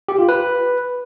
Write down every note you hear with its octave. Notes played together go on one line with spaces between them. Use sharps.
G4
F4
B4